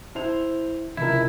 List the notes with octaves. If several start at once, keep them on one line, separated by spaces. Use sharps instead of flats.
E4 C5 F7
F1 C#2 E4 A#4